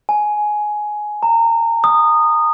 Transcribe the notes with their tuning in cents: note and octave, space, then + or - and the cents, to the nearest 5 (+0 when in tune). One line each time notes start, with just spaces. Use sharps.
G#5 +15
A#5 -25
D#6 -15